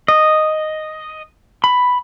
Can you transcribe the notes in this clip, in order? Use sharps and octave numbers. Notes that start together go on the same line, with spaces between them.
D#5
B5